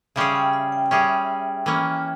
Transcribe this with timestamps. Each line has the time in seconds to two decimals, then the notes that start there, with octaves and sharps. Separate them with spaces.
0.16 C#3 G3 C#4 G#4 E5
0.35 G5
0.53 E5
0.72 G5
0.86 G5
0.91 G3 C#4 G#4 E5
1.66 E3 A#3 C#4